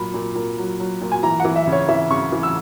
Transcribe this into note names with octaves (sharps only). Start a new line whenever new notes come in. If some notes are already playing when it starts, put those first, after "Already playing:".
Already playing: A#2 F#3 B5
A#2
A#2
F#3
F#3
A#2
G#5
E3 A#5
E3 F#5
E5
C#3
C#5
E3 E5
C#3 C#6
E3
E6